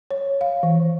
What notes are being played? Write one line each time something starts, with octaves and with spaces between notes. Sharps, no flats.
C#5
F5
E3